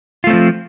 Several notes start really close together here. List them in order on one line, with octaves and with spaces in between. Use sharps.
F4 A3 C4 F3